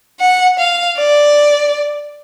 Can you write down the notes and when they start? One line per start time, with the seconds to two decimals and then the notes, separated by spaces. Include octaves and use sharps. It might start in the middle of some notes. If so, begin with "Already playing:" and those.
0.20 F#5
0.59 F5
0.98 D5